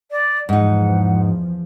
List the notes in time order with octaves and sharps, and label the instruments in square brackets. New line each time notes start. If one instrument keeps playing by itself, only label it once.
[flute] D5
[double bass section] E2 F3 [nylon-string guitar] G#2 D#4 [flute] F#5